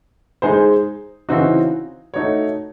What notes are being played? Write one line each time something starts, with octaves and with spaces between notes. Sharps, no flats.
G#3 D#4 G#4 C5
C#3 E3 C4 D#4 F#4
A3 D#4 F#4 C#5